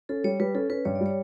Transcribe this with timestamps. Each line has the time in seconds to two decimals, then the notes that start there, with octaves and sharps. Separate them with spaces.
0.09 C#4 A4
0.24 G3 C#5
0.40 G3 B4
0.55 C#4 A4
0.70 C#4 B4
0.85 G2 C#5
0.95 D5
1.01 G3
1.06 C#5